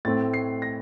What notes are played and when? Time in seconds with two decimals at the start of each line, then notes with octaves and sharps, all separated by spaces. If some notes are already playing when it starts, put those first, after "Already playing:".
0.05 A2 A3 C4 A6
0.34 C7
0.62 A#6